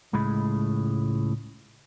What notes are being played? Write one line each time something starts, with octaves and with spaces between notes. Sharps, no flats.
C#2 A2 G#3 B5